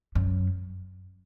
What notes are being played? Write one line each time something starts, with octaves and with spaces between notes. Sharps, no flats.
F#2